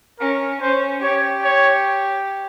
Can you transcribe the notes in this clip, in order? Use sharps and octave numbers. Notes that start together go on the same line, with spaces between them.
C#4 A#4
C#4 C5
G4 C#5
C#5